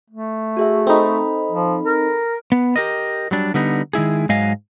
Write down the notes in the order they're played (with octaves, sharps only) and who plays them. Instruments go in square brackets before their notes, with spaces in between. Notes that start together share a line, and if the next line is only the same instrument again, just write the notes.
[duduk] A3
[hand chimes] F#4 G#4 E5
[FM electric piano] C4 D#4 [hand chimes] A4 B5
[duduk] F3
A#4
[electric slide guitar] B3
G4 A#4 D#5
F#3 G3 D4
D3 G3 B3 D#4
D#3 G#3 E4 G#4
G#2 F#3 G#3 D#5 F5 G#5